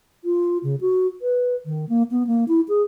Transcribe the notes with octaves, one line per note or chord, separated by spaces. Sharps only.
F4
C#3
F#4
B4
D#3
A#3
B3
A#3
E4
G#4